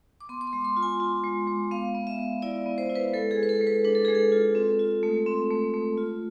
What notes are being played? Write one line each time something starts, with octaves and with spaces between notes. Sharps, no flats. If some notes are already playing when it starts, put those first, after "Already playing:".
D6
B3 C6
D6
C6
G#3
C6
F4
G#5
F4
G#3
G#3
B3 F5
B3
E5
B3
E4 D5
B3
C5
E4
B4
G#3 A4
G#4
G#3
B4
A4
G#3
B4
D4 B4
A4
G#3 G#4
A4
F4
C4
F4
A3
C4
A3
A3
F4